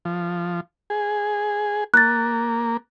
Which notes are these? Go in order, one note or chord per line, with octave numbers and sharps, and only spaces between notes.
F3
G#4
A#3 F#6 A6